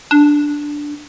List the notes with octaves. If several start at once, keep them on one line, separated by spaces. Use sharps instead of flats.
D4